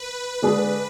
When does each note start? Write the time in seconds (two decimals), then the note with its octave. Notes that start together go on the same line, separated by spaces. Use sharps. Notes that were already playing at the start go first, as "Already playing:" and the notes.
Already playing: B4
0.42 D3 G#3 D4 G#4